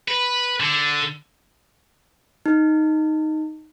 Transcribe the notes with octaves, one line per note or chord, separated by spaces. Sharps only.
B4
D3
D#4